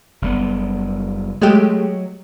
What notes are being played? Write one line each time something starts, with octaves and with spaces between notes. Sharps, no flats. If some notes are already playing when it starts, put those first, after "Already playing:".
F#1 G3 B3
F#3 G#3 A3 G4